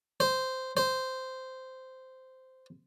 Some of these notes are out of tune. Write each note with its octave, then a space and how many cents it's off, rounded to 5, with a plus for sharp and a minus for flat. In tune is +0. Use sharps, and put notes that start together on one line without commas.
C5 -10
C5 -10